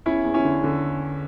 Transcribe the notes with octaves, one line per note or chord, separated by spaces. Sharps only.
E2 C#4 E4
E2
C#4 E4
D3
D3